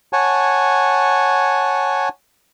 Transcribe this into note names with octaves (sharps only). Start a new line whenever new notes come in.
C#5 F#5 G#5 A5